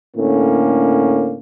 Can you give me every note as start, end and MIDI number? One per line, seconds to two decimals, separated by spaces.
0.17 1.39 45
0.17 1.39 50
0.17 1.39 58
0.17 1.39 61